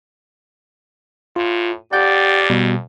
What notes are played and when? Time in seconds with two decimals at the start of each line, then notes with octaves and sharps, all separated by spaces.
1.36 A2 F4
1.93 F2 G4 D5 F#5 G6
2.50 B2 G3